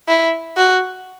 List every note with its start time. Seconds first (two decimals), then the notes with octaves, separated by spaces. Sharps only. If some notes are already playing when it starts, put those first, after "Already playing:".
0.08 E4
0.57 F#4